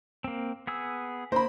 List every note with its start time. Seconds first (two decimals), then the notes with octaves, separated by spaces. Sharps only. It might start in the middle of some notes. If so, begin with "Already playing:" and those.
0.24 A#3 C4
0.67 B3 G#4 E6
1.32 A#3 C5 B5